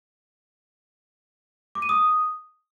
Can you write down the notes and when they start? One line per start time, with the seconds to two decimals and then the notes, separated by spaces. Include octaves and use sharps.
1.75 D6
1.82 D#7
1.89 D#6